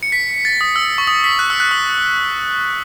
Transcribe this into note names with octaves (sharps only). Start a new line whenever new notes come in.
C#7
B6
A6
D#6
E6
C#6
D#6
B6
F#6
E6
F#6
D#6